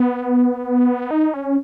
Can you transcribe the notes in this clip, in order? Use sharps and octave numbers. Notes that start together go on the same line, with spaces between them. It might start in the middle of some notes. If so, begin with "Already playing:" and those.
Already playing: B3
D#4
C#4